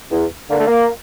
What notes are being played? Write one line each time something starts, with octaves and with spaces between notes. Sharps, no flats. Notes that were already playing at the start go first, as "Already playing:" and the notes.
E2
D3 A#3
A3
A#3